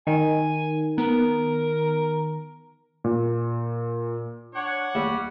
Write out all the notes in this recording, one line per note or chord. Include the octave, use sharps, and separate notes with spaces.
D#3 G#5
B3 A#4
A#2
D4 C#5 F#5
D#2 G3